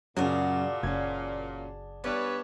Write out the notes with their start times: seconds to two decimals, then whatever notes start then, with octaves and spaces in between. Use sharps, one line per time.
0.17 F#2 A#2 C#3 F#3 D4 F#4 G#4
0.83 F#1 C#4 G#6
2.04 G2 B3 D4 B4 C#5 D5